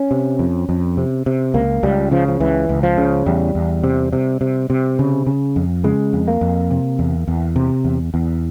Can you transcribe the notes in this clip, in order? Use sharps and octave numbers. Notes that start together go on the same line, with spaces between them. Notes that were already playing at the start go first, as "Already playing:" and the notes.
Already playing: C#4
C3
F2
F2
C3
C3
C#2 A#3
C#2 G3
C#3 F3
F3
C#2 E3
C#2
F3
C#3
E2 G3
E2
C3
C3
C3
C3
C#3
C#3
F2
C#3 G#3
F2
A#3
F2
C3
E2
E2
C3
E2
E2